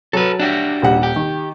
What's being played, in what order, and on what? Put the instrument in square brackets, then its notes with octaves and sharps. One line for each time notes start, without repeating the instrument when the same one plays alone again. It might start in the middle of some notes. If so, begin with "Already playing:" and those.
[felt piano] F#3 [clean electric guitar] A4 B4
[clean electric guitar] D4 F#4 G4
[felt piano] D#1 G3 F#5
[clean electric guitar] G4
[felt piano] D#3